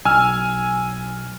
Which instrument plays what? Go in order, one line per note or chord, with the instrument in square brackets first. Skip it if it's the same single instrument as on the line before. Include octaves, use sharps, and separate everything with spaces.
[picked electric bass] B1 [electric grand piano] G#5 E6 F6